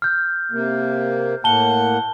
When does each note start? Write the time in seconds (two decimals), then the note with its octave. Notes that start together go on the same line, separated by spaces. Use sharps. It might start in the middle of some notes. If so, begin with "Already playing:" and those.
0.02 F6 G6
0.52 C3 A#3
1.44 A2 A#3 F#5 A5 G7